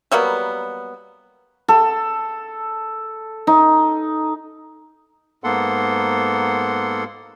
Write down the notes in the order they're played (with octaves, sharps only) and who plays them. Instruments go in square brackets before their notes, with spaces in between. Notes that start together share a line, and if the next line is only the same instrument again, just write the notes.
[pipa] F#3 G3 A#3 B3
[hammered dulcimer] A4
D#4
[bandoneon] G#2 A#3 B3 A4 F#5 C6